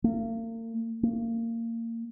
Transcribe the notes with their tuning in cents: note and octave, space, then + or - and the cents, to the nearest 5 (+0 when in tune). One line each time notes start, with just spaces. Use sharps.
A#3 -40
A#3 -25